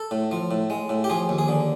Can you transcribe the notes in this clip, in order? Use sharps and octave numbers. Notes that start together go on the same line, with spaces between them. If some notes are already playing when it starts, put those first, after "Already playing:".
Already playing: A4
A2
F3
A2
G#3
A2
G4
F3 G#4
D#2
G#4
D3